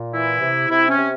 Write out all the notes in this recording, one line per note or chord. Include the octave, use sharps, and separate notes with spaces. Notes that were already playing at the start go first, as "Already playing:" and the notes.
Already playing: A#2
E3 E4
C3
C3 E4
C#4
C3